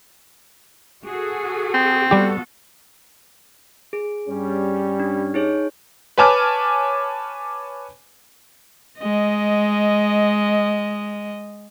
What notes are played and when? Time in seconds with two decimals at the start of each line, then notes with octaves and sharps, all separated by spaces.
1.05 F#4 G#4 A4
1.74 C4
2.11 G3 B3 F#4 G4 A4
3.93 G#4
4.28 G2 G3 C#4
5.00 D4
5.34 D#4 G#4 C#5
6.18 B4 C#5 G#5 A5 D6 F6
8.99 G#3 D#5